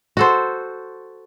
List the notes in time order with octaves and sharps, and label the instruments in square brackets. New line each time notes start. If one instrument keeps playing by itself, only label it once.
[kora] F#4 A4 C5